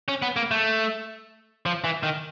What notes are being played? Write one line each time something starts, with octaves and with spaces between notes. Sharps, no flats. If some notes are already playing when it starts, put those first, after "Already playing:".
C#4
B3
A#3
A3
F3
E3
D#3